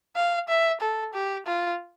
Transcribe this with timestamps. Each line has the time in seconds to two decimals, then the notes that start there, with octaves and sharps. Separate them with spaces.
0.16 F5
0.48 E5
0.81 A4
1.14 G4
1.47 F4